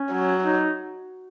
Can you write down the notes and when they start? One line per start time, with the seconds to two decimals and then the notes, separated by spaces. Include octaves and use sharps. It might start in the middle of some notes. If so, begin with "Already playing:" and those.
Already playing: C#4
0.12 F#3
0.43 D#4